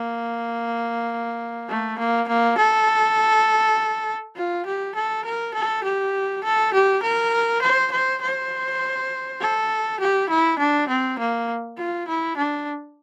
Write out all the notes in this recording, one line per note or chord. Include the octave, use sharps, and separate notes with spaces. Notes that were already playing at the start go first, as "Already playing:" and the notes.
Already playing: A#3
A3
A#3
A#3
A4
F4
G4
A4
A#4
A4
G4
A4
G4
A#4
C5
C5
C5
A4
G4
E4
D4
C4
A#3
F4
E4
D4